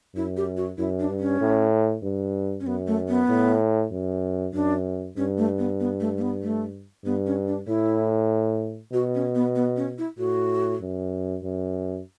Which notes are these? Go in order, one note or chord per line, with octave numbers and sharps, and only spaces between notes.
F#2 E4
G4
F#4
F#2 E4
D4
G2
C#4
A2
G2
C#4
F#2 B3
A3
B3
A2
F#2
F#2 D4
G2 C#4
A3
B3
B3
A3
A3
B3
A3
G2 B3
C#4
D4
A2 E4
B2 F#4
C#4
B3
B3
C#4
E4
A2 F#4
F#2
F#2